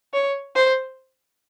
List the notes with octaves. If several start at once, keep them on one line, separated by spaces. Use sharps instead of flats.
C#5
C5